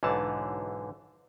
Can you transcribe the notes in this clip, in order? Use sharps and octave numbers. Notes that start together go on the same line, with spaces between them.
B1 G#2 D3 E3 A5